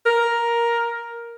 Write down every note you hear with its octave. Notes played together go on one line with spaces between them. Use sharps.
A#4